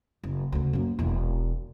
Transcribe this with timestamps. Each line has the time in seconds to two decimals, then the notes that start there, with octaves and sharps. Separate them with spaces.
0.23 F#1
0.52 D2 C#3
0.73 F#2 A#3
0.99 E1 E3